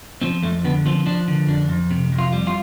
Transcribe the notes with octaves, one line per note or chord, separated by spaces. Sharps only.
F3 C4
F2 A3
D3 B3
F3 C4
F3 D4
D3
F2 D4
F2
C3
F2
F4
G3
F4